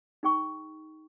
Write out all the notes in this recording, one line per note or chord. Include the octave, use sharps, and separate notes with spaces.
D#4 G#4 G5 C#6